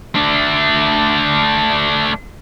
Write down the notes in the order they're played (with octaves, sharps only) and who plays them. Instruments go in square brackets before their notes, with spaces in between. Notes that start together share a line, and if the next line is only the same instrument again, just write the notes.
[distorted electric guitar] A3 D4